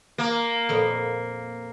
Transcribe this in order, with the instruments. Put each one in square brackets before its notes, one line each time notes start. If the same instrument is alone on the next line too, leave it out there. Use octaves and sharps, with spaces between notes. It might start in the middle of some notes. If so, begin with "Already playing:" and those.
[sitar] A#3
[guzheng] F2 A#2 B3